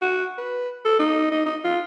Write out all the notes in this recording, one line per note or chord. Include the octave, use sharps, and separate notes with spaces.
F#4
B4
A4
D#4
D#4
D#4
F4